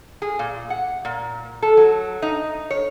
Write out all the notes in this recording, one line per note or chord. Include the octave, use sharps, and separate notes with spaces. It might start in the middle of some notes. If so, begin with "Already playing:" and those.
G#4
A#2
F#5
A#2
A4
F#3
D#4
C#5